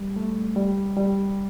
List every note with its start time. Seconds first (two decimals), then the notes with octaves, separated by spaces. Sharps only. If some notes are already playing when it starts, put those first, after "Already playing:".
Already playing: G3
0.16 A3
0.56 G3
0.97 G3